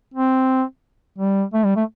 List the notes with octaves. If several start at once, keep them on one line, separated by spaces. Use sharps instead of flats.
C4
G3
A3
G3
A3